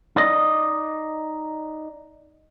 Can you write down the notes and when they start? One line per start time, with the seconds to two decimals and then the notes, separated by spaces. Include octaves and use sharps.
0.16 D#4 D5 D#5